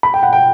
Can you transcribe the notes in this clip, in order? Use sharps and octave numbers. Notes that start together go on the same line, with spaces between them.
B5
G5
F#5
G5